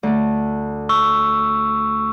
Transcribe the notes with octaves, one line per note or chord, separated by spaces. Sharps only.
D2 A3
C#6 E6